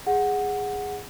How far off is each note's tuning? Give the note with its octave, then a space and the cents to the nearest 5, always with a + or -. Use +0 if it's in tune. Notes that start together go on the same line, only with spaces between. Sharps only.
G#4 -10 F#5 +0